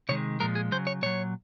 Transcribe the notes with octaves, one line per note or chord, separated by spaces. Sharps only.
C3 D#3 G#3 C#5
A#2 F3 G#3 A#4
G#4
C#3 F#3 C5
C#5
A#2 F#3 C#5